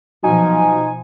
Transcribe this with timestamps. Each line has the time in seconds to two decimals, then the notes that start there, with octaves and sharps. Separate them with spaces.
0.24 B2 F3 F#3 D#4 G#5